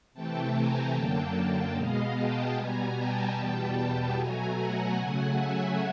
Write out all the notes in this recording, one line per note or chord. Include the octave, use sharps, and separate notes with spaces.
C3 E3 A3 G5 A5
G#5 A#5
F#2 D3 F#3 A#3 G5 A5
G5 A5
B2 G#3 B3 D#5 F5
G5 A5
B2 G3 B3 G#5 A#5
G5 A5
E2 B2 G3 B3 G5 A5
B2 F#3 A3 G#5 A#5
F#5 G#5
C#3 F#3 A3
E5 F#5